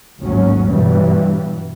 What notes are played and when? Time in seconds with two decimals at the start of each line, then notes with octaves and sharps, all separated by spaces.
0.19 G#1 D#2 A2 F#3 C#4
0.65 G2 B2 E3 F#3 G3